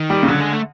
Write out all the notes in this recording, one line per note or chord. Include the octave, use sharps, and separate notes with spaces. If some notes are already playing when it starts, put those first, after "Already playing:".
Already playing: D#3
G3
C#3
D3 F#3
G#3
A3